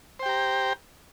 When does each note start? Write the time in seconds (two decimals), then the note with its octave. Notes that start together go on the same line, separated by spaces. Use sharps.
0.19 C5
0.23 G5
0.26 G4
0.29 A#5